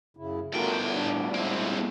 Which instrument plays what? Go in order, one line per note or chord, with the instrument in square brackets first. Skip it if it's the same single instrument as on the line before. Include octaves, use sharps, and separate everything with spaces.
[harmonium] F#2 C#3 E4
[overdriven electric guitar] G2 B2 [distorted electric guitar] D3 G5 [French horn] A3 [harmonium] F4 F#4 A#4
[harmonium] A2 [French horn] D4
[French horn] F3 [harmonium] G#3 E4 [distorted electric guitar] A#3 C4